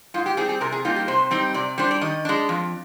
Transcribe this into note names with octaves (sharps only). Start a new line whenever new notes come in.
G#2 F4
G4
G3 C4 G#4
G#4
C3 A#4
G#4
G3 A#3 D#4 F4
G4
C3 C5
G3 C4 D#4
C3 D5
G3 D4 C5
D5
D#3 D#5
G#3 D4
F2